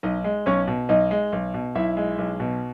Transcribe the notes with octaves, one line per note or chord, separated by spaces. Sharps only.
B1 D#4 D#5
G#3
B1 C#4 C#5
B2
B1 D#4 D#5
G#3
B1
B2
B1 E4 E5
G#3
B1
B2